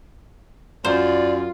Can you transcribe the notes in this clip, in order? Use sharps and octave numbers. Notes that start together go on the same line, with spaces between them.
F#2 F4 C5 D5